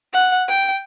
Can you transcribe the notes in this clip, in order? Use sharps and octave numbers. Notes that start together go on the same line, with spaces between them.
F#5
G5